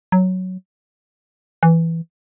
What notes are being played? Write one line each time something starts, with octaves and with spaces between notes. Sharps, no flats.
F#3
E3